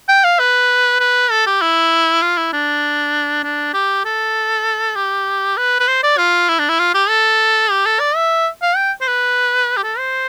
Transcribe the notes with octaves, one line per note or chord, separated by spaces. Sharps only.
G5
F5
B4
B4
A4
G4
E4
F4
E4
D4
D4
G4
A4
G4
B4
B4
C5
D5
F4
E4
D4
E4
F4
G4
A4
G4
A4
D5
E5
F5
G5
C5
B4
G4
A4
C5